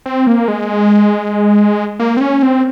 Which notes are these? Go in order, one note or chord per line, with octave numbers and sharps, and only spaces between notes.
C4
A#3
G#3
A#3
C4
C#4
C4